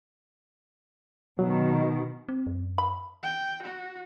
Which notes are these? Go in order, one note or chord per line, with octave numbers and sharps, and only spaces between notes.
B2 D#3 F#3
C4
F#2
B5
G5
F#4